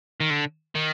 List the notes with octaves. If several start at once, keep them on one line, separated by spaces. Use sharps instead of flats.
D#3
D3
D#3